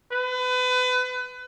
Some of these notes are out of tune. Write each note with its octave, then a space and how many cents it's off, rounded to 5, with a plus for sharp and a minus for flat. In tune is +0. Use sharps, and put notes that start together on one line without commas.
B4 +30